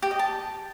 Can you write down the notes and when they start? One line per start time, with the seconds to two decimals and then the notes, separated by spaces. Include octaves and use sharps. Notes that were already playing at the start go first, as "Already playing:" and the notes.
0.02 G4
0.11 D#5
0.19 A5